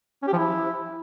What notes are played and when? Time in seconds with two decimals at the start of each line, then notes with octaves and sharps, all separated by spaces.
0.22 C#4
0.28 G4
0.33 F3
0.38 E4